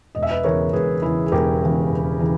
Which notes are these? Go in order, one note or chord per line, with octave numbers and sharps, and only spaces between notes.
E1 D#5
E5
B4 D#5
E2 C#3 E3 A#4 C#5
E1 G#4 B4
E2 C#3 E3 E4 G#4
G#4
E1 G4 A#4
E2 C#3 E3
E1
C#3 E3